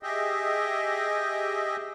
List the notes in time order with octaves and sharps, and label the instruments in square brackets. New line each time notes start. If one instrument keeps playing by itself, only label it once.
[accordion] G4 G#4 D#5 E5